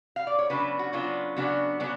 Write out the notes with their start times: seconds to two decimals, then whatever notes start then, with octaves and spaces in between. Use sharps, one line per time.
0.16 F5
0.27 D5
0.39 C#5
0.50 C#3 F#3 B3 D4 B4
0.79 F#4
0.93 C#3 F#3 B3 D4 F4
1.36 C#3 F#3 B3 D4 F#4
1.80 C#3 F#3 B3 D4